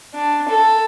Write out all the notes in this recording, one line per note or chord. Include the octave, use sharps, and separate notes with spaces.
D4
A4